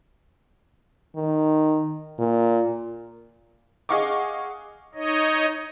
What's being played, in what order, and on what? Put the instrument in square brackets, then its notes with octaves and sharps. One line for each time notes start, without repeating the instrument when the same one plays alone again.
[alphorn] D#3
A#2
[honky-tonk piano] G#4 D#5 F5 F#5 C#6 D6
[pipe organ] D#4 C#5 D#5